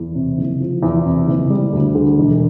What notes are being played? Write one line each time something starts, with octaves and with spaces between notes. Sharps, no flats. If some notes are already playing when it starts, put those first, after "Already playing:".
Already playing: E2
C3
F#1
F3
E2
C3
F#1
G3
D2
D3
E1